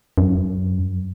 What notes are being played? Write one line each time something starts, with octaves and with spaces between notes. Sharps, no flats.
F#2